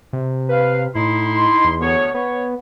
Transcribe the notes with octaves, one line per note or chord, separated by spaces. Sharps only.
C3
B4 F5
A2 D#4 E4 C6
E2
D2 B3 C#5
B3 C#5